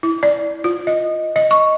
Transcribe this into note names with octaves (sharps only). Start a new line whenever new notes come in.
E4
D5
F4
D#5
D#5
C#6